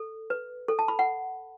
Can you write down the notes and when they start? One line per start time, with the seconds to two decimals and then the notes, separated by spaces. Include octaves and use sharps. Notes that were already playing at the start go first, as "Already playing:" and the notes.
Already playing: A4
0.30 B4
0.68 A4
0.79 A5
0.88 B5
0.99 F#5